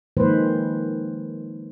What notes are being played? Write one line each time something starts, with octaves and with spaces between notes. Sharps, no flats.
D#3 F3 G#3 A#3 B4 C5